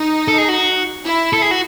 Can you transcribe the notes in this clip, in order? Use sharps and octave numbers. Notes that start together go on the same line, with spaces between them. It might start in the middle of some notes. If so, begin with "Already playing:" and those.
Already playing: D#4
A4
G#4
F#4
E4
A4
G#4
F#4